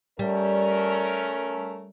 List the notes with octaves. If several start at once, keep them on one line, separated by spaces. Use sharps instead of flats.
G3 A3 C#4 A#4